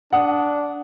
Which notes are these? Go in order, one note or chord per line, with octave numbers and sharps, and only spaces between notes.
D4 F#5 D#6